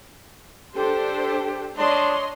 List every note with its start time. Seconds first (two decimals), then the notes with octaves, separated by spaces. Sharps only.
0.74 D4 G4 A4 C5
1.78 D4 C#5 D#5 C6